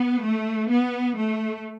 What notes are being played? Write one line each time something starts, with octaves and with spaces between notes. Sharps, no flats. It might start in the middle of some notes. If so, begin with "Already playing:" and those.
Already playing: B3
A3
B3
A3